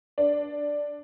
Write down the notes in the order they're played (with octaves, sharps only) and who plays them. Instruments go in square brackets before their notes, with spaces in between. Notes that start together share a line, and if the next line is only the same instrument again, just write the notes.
[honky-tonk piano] D4